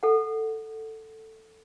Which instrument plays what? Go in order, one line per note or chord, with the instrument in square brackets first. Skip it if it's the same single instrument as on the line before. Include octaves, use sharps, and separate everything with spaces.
[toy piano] A4 F#5